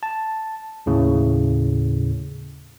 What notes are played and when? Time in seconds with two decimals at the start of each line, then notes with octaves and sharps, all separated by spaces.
0.03 A5
0.86 D#2 A2 C#3